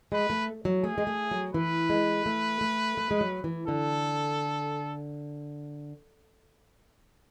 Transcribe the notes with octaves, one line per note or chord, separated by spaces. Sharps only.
G#3 B4
A3
F#3
A3 G#4
G#3
A3
F#3
E3 B4
G#3
A3
A3
A3
G#3
F#3
E3
D3 A4